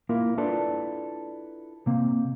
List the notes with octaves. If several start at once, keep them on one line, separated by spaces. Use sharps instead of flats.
A#3 E4 F4 A#4
D4 E4 F4 A4 B4 D5
C3 A#3 C4